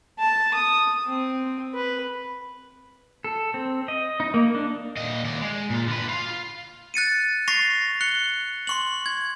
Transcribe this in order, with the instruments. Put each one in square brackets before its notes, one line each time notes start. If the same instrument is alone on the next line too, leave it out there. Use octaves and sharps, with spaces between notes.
[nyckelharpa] A5
D#6
C4
B4
[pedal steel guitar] A4
C4
D#5
D#4
A#3
D4
[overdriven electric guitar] A#2 D#5
D#2 D5
G#3
A#2 F4
D3 B4
F4 F5
[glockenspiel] F#6 A6 C#7 D#7
C#6 A6 A#6 C7 F7
F#6 C#7 G7
C6 C#6 F#7
G#6